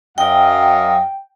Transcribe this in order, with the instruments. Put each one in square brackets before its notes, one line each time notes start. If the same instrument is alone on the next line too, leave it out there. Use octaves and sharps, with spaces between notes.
[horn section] F#2 D#5 F5 [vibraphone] G5